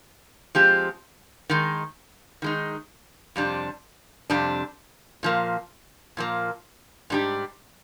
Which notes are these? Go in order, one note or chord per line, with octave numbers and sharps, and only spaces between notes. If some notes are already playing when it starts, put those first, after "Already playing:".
F3 G#3 C4 G4
D#3 G#3 D#4
D#3 G#3 D#4
F2 C3 G3 D4
F2 C3 G3 D4
A#2 F3 A#3
A#2 F3 A#3
G#2 G3 D4 G4